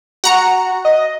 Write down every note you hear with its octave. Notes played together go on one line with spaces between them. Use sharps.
F#4 F#5 A#5 C#7
D#5